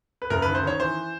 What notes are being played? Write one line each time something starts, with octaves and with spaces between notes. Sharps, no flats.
B4
F#1 A#4
D#3 B4
C5
D#3 C#5
E3 C5